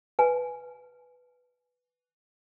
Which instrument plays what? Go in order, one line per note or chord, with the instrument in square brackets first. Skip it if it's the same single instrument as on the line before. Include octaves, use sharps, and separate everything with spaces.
[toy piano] B4 G#5